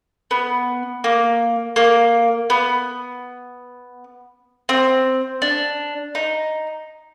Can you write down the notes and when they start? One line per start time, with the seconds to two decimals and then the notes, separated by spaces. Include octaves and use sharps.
0.31 B3
1.04 A#3
1.76 A#3
2.50 B3
4.69 C4
5.42 D4
6.15 D#4